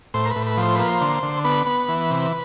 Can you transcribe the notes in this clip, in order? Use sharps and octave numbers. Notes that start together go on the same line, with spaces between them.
A2 C5
A#4
B4
A2
B4
F3
C5
A#3 B4
C5
D3
D3
B3 B4
B3
E3
C3